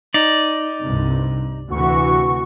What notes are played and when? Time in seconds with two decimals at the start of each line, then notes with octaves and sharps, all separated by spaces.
0.14 D#4 D5
0.82 C2 G2 C3
1.70 D2 C3 E3 F#4 C#6